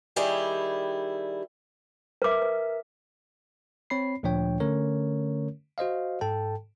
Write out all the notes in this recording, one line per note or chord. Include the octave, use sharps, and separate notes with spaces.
D#3 G3 E4 G4 G#4
A#4 B4 E5 D6
B4
C4 C#5 B5 C7
D2 A#2 F3 D4 C#5 G5
D3 A3 C#4 A#4 C#5
F#4 C5 D#5 F5
G#2 A4 G5 A5